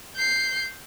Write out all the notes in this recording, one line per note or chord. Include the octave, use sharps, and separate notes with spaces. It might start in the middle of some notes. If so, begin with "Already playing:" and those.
G6 C7